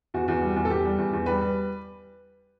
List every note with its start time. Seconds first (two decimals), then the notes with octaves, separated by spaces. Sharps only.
0.14 E2 F#4
0.28 E2
0.42 G3
0.56 E2
0.65 A4
0.70 E2 G4
0.85 G3
0.98 E2
1.13 E2
1.26 G3 B4
1.41 G3